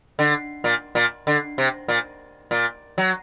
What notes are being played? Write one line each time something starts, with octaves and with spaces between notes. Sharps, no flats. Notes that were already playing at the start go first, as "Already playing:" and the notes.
D3
A#2
A#2
D3
C3
A#2
A#2
F#3